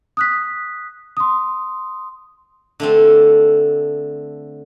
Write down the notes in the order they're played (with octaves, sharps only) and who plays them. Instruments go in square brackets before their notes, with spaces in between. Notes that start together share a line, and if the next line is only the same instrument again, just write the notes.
[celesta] D#6 F#6 B6
C6 D#6
[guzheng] D3 A3 C4